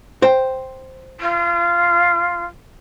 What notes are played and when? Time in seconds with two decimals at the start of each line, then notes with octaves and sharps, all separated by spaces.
0.22 C5 G5
1.20 F4